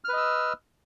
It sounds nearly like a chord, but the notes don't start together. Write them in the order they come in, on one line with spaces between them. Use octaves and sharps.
F6 B4 D#5 E6